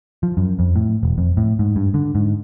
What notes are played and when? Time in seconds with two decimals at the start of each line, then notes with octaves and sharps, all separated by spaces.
0.23 F3
0.37 F#2
0.59 F2
0.76 A2
1.03 E1
1.18 F2
1.37 A2
1.59 G#2
1.76 G2
1.94 D3
2.15 G#2